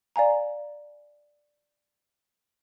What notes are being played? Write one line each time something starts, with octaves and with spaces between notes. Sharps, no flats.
D5 F5 G#5 A#5